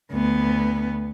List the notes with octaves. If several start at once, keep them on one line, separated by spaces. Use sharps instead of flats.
D2 B3